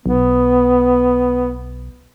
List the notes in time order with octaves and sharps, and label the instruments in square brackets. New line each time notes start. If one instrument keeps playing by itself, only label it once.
[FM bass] B1 [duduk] B3